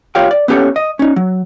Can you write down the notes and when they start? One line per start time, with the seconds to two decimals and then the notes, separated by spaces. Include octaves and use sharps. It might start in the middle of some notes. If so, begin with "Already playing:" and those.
0.15 F4 G4 C#5 F5 G5
0.31 D5
0.48 B3 C#4 G4 A4 C#5
0.76 D#5
0.99 C#4 D#4
1.16 F#3